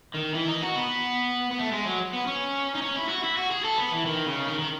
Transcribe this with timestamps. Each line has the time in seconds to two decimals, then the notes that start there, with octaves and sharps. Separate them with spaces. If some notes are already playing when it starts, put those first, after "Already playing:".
0.14 D#3
0.34 E3
0.48 D#4
0.62 F#4
0.75 B3
1.51 B3
1.59 A3
1.72 G#3
1.86 F#3
2.14 B3
2.27 C#4
2.75 D#4
2.82 C#4
2.96 E4
3.09 F#4
3.24 E4
3.37 F#4
3.51 G#4
3.65 A4
3.78 B3
3.92 E3
4.06 D#3
4.26 C#3
4.47 D#3
4.59 D#3